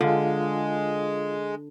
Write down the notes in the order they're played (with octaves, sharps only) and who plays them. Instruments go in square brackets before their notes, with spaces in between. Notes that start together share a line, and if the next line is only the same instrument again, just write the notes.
[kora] D3 [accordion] G#3 [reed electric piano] F4 F5